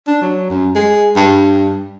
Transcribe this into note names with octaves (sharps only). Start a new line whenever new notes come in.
D4
F#3
F#2
G#3
G2